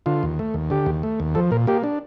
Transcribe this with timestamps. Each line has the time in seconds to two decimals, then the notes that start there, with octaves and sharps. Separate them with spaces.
0.06 D3 F4
0.23 D#2
0.39 A3
0.54 D#2
0.70 D3 G4
0.86 D#2
1.03 A3
1.20 D#2
1.35 F3 A4
1.51 A#2 A#4
1.67 A#3 G4
1.84 D4